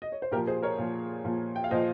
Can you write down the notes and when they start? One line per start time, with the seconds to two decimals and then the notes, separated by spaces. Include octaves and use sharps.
0.02 D#5
0.12 C#5
0.22 C5
0.32 A#2 G4 A#4
0.36 F3
0.47 G#4 C5
0.63 A#4 C#5
0.78 A#2 F3
1.25 A#2 F3
1.56 G5
1.64 F5
1.71 A#2 F3 C5 D#5